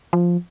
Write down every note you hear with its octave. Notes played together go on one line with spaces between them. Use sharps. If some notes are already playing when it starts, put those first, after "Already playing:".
F3